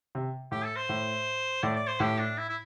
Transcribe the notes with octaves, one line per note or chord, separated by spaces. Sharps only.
C3
A2 G4
A4
C5
A2
A2 D5
D5
C5
A2 G4
D4
E4
E4